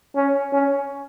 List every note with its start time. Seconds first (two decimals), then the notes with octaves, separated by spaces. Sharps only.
0.16 C#4
0.53 C#4